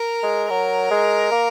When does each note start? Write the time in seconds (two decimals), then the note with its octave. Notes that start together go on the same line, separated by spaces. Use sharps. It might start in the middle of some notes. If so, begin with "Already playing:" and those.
Already playing: A#4
0.23 G#3
0.50 F#3 A#4
0.91 G#3
1.32 A#3